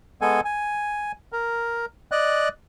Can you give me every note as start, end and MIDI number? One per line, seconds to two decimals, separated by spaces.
0.22 0.41 56
0.22 0.41 59
0.22 0.41 69
0.22 0.41 80
0.45 1.12 80
1.33 1.86 70
2.12 2.49 74
2.12 2.49 75
2.12 2.49 90